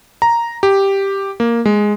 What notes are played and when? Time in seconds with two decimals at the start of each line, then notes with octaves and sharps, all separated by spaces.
0.22 A#5
0.63 G4
1.40 A#3
1.65 G#3